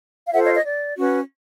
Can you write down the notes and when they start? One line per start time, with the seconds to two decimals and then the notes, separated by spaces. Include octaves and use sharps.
0.27 F5
0.33 F4 A4 C5 E5 F#5
0.44 C#5 D#5
0.54 C#5 D#5
0.65 D5
0.97 C#4 F#4 B4